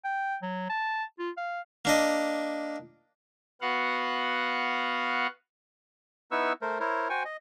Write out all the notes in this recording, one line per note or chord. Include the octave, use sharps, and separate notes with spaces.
G5
F#3
A5
F4
F5
A#3 D4 D#5
B3 F#4 F5 F#5
B3 D#4 E4 B4 C#6 E6
A3 A#4 C5
E4 A#4 C5 C#5
F#4 C5 G5 G#5 C#6
D#5